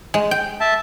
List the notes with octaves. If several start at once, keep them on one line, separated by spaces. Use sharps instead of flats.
G#3
G5
E5 A5